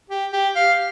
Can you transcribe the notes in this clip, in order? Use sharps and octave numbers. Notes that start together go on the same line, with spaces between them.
G4
G4
F5